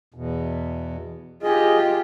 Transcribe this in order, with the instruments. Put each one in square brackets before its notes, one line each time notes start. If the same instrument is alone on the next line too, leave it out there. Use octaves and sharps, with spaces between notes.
[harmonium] E2 B2
[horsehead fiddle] F4 G4 [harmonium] G#4 D#5